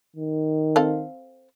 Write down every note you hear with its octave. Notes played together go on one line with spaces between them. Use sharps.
D#3
C4 A4 F5